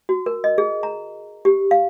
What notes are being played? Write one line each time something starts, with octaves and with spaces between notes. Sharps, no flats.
F#4
A#4
D#5
G#4
A#5
G4
F5